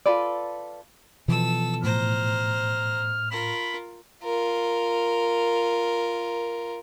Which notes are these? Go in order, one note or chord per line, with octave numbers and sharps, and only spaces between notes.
F4 A4 B4 D5
B2 E3 F3 A4 E6
A2 C5 A#5 F6
F4 A#4 B5
F4 A#4